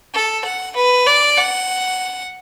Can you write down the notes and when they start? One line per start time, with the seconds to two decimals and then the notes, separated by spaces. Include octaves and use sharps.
0.14 A4
0.45 F#5
0.76 B4
1.06 D5
1.38 F#5